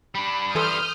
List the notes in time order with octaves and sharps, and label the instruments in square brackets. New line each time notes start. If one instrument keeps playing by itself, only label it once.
[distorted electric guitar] G3 D4 [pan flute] B5
[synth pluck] E3 A4 [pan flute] C6 [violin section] D#6 F6 G6